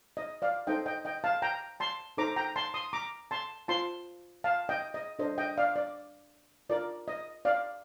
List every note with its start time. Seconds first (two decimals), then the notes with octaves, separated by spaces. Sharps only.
0.17 D#5
0.42 D5 F5
0.67 D#4 A4 C5 D#5 G5
0.86 D#5 G5
1.05 D#5 G5
1.24 F5 A5
1.42 G5 A#5
1.80 A5 C6
2.17 D#4 A4 C5 A#5 D6
2.36 G5 A#5
2.56 A5 C6
2.74 C6 D#6
2.93 A#5 D6
3.31 A5 C6
3.68 F4 C5 A5 C6
4.44 F5 A5
4.69 D#5 G5
4.94 D#5
5.19 D4 A4 C5 D#5
5.38 D#5 G5
5.58 D5 F5
5.76 D5
6.69 F4 A#4 D5
7.08 D#5
7.45 D5 F5